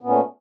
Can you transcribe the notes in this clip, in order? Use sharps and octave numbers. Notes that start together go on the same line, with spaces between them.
A#2 A3 B3 C#4